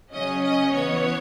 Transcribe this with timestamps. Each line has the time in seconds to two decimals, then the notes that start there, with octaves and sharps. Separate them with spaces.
0.13 C#3 F#3 C#4 D#5
0.43 D#5
0.73 E3 B3 C#5